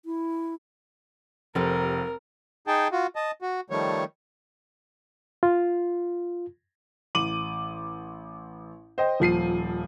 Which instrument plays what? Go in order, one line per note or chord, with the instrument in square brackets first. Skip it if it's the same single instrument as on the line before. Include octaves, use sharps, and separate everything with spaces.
[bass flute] E4
[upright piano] F1 [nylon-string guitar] F3 G4 A4 [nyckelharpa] A#4
[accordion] D#4 G#4 G5 A5
F4 F#4
D#5 A5
F#4
D#3 F3 G3 A3 C#5
[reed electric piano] F4
[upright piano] A1 D6 D#7 F#7
C5 D#5 G5
D#1 F3 C7 D#7